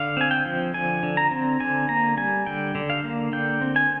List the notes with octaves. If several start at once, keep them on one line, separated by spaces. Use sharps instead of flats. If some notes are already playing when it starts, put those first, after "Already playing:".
Already playing: D3 F5
C4 G#5
G5
F3
D3 G#5
D3
A#5
C4
D3 G#5
A#3 A#5
G3 G#5
D3 G5
D3
F5
A#3
D3 G5
C4
G#5